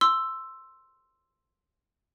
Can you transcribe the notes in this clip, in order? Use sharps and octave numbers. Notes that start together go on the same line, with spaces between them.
C6 E6